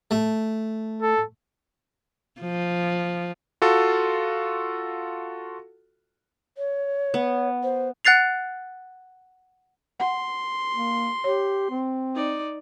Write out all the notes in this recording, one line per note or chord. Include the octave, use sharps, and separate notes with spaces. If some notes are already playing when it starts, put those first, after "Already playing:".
A3
A4
F3
F4 F#4 A4
C#5
B3
C5
F#5 F#6 A6 C7 F7
F#5 C6
A#3
G4 C#5
C4
D#4 D5